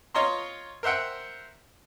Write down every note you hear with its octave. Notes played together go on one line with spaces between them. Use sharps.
F4 C#5 D#5 A#5 C6
A#4 C5 E5 F#5 G5